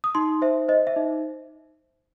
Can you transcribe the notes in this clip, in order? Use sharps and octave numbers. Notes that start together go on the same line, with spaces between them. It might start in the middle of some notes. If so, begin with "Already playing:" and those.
D#6
D#4 C6
C5 E5
C5 D#5
E5
D#4